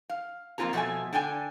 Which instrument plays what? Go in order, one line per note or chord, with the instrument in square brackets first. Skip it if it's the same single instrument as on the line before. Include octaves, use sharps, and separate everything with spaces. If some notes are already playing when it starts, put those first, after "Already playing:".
[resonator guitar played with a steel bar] F5
F2 A#3 C4 F4 G#4 A#5
B2 F3 A3 E5 G#5
D3 D4 G5 G#5